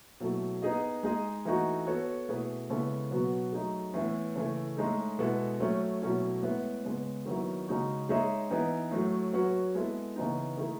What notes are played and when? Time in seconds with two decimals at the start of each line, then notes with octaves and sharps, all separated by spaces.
0.20 B2 F#3 A3 E4 A4
0.62 B3 D#4 G#4 D#5
1.03 G#3 D#4 G#4 D#5
1.45 E3 A3 D#4 F#4
1.87 B3 F#4 A4 C#5
2.28 B2 A3 E4 G#4 B4
2.70 C#3 G#3 B3 E4 A4
3.11 B2 F#3 B3 F#4
3.52 F#3 A3 D#4 G#4
3.94 A2 E3 B3 E4
4.36 C#3 E3 A3
4.77 A2 G#3 D#4 A4
5.19 B2 G#3 B3 E4 A4
5.60 A2 F#3 A3 C#4
6.02 B2 F#3 A3 C#4 E4
6.43 A2 G#3 B3 E4
6.84 C#3 G#3 B3
7.26 D#3 F#3 B3 E4
7.67 C#3 G#3 D#4 F#4
8.09 G#3 D#4 G#4 C#5 E5
8.50 E3 B3 D#4
8.91 A2 F#3 A3
9.33 F#3 C#4 F#4 B4
9.75 G#3 B3 E4 A4
10.16 C#3 E3 B3 D#4
10.57 D#3 A3 E4 G#4